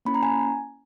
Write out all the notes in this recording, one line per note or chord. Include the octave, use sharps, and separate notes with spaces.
A#3 C#4 E4 B5
A#5
G#5